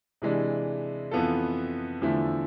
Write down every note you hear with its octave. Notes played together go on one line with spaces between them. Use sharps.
C3 E3 G#3 D4
F2 E3 B3 F4 A4
E2 D3 F3 A3 E4